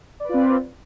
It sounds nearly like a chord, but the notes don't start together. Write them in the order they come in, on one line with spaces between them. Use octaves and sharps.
D5 B4 F4 C4